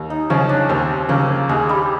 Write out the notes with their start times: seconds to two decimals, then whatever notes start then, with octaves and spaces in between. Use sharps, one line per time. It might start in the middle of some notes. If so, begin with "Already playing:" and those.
Already playing: D#2
0.10 D#4
0.30 C#3 F3 C#4
0.49 D4
0.69 D#2 C4
1.09 C#3 F3 A#3
1.49 D#2 G#3
1.69 G3